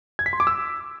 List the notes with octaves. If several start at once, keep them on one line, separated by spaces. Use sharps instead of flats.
G#6
B6
C6
D6
E6